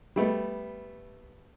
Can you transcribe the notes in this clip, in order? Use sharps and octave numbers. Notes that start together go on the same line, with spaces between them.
G3 A3 B3